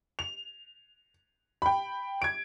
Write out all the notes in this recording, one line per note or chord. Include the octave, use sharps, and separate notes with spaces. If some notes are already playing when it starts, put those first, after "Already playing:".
F7
G5 B5
G#6 D7